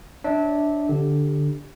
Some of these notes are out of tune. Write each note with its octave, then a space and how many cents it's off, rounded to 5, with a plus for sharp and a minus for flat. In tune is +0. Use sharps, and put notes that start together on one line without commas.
D4 +0 C#5 +0 E5 -30
D3 +0 G4 +0